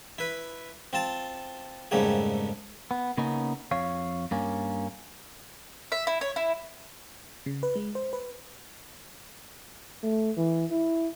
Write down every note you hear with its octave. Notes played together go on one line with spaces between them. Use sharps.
E4 B4
C4 F4 A5
F2 G#2 C#3 G3 A3 A#3
B3
C#3 A#3 B3 C#4 D#4
F2 C#5 F5
G2 A#3 C#4
E5
E4
C#5
E4
C#3
B4
G#3
C5
B4
A3
E3
E4